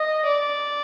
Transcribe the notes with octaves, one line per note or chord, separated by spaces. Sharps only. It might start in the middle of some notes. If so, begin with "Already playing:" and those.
Already playing: D#5
D5